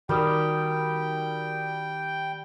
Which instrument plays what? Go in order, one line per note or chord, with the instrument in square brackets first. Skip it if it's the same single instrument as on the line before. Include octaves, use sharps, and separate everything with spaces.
[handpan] D#3 [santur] G3 G4 [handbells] F#4 A#4 D#6 [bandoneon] G5